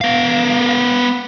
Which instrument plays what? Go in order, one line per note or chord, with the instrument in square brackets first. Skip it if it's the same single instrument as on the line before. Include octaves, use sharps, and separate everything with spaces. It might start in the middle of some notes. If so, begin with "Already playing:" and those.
[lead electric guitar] B3 F5